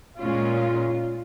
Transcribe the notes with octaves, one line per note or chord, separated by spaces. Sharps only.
A#2 G#3 C#4 F4